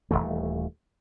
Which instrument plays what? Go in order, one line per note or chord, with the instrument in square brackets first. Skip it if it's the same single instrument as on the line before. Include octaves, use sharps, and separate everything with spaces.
[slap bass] D#1 D#2 E3 A3